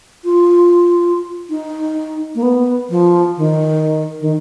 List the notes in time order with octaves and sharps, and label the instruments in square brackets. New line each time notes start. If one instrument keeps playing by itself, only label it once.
[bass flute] F4
D#4
A#3
B3
F3
D#3
D#3